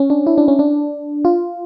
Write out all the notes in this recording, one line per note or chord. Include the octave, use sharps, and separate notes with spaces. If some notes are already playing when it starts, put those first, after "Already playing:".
Already playing: C#4
D4
E4
D4
C#4
D4
F4